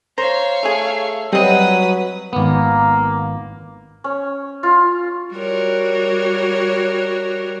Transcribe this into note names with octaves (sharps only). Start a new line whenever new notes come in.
C5 C#5 F5 A#5
A3 G#4
F#3 G3 C4 B4 D#5 D#6
G#1 A#3 B3
C#4
F4
G3 F#4 A#4 C#5